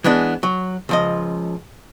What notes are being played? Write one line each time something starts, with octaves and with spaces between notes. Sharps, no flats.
E3 G#3 B3 D4
F#3
C#2 F3 D#5